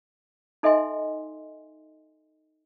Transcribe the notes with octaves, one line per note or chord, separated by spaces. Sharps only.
D#4 A4 D#5 E5 G#5 C6